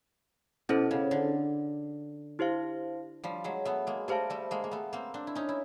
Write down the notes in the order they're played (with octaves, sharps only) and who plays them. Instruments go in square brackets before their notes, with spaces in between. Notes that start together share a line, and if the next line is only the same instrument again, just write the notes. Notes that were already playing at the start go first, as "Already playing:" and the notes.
[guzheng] B2 [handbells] C#4 E4 A4 C5
[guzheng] C#3
D3
[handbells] E4 G4 C5 F5
[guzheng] F3 G3
F#3 G#3
A3 B3
G#3 A#3
[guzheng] G3 A3 [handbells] G4 C5 F5 A5
[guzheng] G3 A3
G#3 A#3
A#3
A3 B3
A#3 C4
C4 D4
E4
C#4 D#4
E4